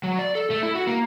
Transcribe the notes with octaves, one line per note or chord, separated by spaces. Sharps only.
F#3
D5
A4
A3
E4
F#4
A#3